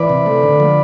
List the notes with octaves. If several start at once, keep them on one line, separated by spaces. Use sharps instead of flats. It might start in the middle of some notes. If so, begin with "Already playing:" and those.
Already playing: E3 B4 D5
C3
A3
D3
F3